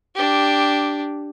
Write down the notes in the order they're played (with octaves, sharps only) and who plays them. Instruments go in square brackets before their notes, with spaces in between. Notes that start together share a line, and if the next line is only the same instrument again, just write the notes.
[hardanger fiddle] D4 G4